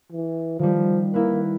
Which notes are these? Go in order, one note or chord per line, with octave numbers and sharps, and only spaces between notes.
E3
D#3 F3 G3
A#3 E4 A#4 B4